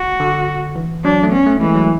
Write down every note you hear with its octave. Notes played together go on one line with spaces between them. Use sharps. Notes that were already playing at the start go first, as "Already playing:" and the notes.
Already playing: F#4
D3
E3
F#3 D4
A3
B3 C#4
A3
E3 G#3
F#3